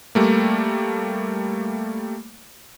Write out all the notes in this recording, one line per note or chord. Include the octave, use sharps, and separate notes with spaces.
G3 A3 A#3